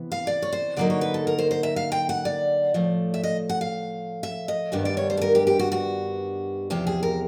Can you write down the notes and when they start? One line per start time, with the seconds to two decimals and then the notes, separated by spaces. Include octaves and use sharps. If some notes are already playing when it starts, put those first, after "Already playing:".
Already playing: C3 E3 B3
0.12 F5
0.27 D5
0.42 C#5
0.53 C5
0.77 D3 F#3 A#3 D#4 D5
0.90 C#5
1.01 B4
1.14 A4
1.27 A#4
1.38 C5
1.51 C5
1.63 E5
1.76 F5
1.92 G5
2.09 F#5
2.25 D5
2.74 A2 F3 A3
3.14 E5
3.24 D#5
3.49 F#5
3.61 F5
4.23 E5
4.48 D#5
4.72 G2 D#3 G3 B3 D4 D5
4.85 D5
4.97 C#5
5.10 C5
5.17 A4
5.22 A#4
5.35 G4
5.47 G4
5.59 F#4
5.72 F#4
6.70 E2 C3 F3 G4
6.87 G#4
7.03 A#4